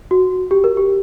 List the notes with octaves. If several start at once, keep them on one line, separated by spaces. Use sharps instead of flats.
F#4
G4
A#4
G4